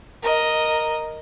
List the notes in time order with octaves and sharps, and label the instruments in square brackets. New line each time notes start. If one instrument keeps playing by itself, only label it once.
[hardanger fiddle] A#4 D#5